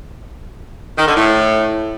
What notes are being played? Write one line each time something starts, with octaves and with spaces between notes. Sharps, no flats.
D#3
D3
A2